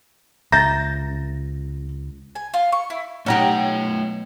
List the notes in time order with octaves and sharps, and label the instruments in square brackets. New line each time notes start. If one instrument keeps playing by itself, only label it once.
[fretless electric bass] C#2 [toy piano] E5 A#5 [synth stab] G6 A6 [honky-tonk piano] A#6
[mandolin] G#5
F4
C#6
E4
[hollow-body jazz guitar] B1 F#5 A#5 [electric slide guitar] A3 G5 [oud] C#4 D#4 G4